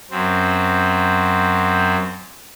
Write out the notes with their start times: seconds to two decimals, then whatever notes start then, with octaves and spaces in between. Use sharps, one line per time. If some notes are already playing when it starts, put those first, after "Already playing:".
0.11 F#2 C4